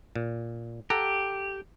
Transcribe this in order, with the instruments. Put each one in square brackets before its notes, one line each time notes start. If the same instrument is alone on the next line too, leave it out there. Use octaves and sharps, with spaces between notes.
[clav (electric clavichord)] A#2
[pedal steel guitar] G4 [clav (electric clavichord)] A4 F#5 A#5